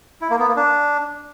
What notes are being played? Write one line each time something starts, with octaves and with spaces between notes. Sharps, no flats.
E4
A#3
B3
A#3
D4